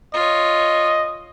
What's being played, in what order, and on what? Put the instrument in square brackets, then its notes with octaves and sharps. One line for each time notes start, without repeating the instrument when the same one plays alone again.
[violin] F4 C#5 [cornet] D#5